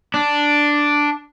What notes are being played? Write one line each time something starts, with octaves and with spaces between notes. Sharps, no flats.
D4